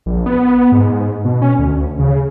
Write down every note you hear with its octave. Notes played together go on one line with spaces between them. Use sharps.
A#1
B3
G#2
B2
C#4
D2
C#3